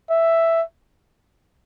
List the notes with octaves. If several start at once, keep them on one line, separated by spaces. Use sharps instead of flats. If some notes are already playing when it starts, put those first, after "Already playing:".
E5